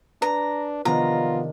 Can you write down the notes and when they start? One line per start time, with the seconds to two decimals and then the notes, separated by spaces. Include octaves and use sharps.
0.22 D4 B4 A#5
0.85 C3 D#3 F3 B3 D4 F4 A#5